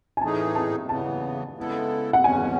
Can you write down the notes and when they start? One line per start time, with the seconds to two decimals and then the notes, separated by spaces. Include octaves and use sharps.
0.17 G#5
0.21 A2 E3 A3 D#4 G#4 A5
0.55 A5
0.89 C#3 E3 B3 A5
1.57 C#3 G#3 B3 E4 A4
2.13 F#5
2.24 E2 B2 G#3 C#4 G#5